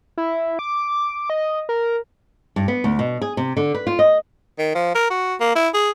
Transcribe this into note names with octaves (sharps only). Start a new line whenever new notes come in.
E4
D6
D#5
A#4
G2
B3
D2
B2
G#4
C3
D3
B4
F4
D#5
D#3
F3
A#4
F#4
A#3
E4
G#4